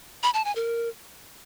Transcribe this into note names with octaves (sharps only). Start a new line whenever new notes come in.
B5
A5
G#5
A#4